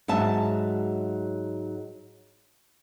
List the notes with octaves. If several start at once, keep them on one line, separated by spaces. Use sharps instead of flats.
G#2 F#3 E5 A5